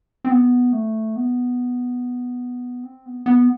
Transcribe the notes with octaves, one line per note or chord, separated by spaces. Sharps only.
C4
B3
A3
B3
C4
B3
B3